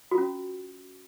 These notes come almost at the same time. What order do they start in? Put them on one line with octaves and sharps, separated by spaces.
F#4 F4 C#4